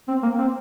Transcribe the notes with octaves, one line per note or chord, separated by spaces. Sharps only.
C4
A#3
C4